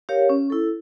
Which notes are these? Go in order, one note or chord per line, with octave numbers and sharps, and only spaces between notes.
G4 A#4 C#5 F5
C#4
E4 A4